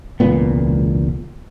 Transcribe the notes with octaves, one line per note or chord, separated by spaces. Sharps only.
E1 C#2 A#2 B3